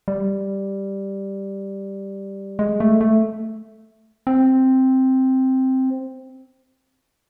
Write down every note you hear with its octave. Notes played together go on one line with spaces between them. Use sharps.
G3
G#3
A3
A3
C4